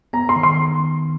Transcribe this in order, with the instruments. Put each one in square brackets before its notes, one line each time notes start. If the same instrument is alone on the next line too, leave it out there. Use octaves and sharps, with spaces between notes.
[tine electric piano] B3 [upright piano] A#5
[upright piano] C6
[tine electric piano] D#3
[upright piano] C6